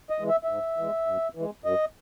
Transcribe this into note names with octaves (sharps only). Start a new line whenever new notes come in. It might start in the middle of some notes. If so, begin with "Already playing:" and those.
D#5
E3 G#3
E5
G#2 E5
E3 G#3
F#2
E3
G#3
F#2 D#5